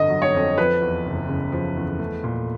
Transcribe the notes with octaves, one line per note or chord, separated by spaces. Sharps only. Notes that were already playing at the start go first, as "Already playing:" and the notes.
Already playing: G1 F2 D3 D#5
F#3
C#5
F2
F3 B4
E2
F#1
C#3
F3
E2
A3
A#2